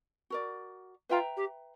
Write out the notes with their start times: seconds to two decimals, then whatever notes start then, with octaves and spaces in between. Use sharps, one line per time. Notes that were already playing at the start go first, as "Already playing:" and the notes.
0.30 F#4 A#4 D5
1.09 F4 B4 E5 G5 A#5
1.36 G4